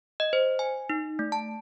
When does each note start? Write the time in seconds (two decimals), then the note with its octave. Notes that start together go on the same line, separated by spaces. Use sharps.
0.20 D#5
0.33 C5
0.59 G#5
0.90 D#4
1.19 A3
1.32 A5